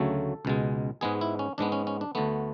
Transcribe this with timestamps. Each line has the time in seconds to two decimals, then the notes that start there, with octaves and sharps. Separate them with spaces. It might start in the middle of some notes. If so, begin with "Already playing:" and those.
Already playing: D2 C#3 F#3 A3 A4
0.45 C#2 B2 G#3
1.01 G#2 G#3 B3 G#4
1.21 E4
1.39 C#4
1.58 G#2 G#3 B3 D4
1.72 C#4
1.87 C#4
2.01 D4
2.15 D2 D3 A3 B3